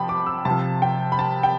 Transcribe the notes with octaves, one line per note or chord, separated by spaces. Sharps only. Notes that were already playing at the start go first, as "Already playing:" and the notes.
Already playing: C3 F3 G5 A5 B5
D6
E6
C3 F3 A5
G5
B5
A5
G5